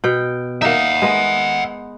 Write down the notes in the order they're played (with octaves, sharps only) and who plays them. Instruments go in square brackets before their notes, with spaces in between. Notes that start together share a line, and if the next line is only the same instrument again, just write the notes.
[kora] B2 G5
[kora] A#3 D#4 [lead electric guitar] E5 F#5
[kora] G#3 B3 B4